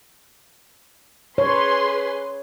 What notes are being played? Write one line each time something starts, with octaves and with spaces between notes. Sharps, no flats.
G#4 B4 C#5 C6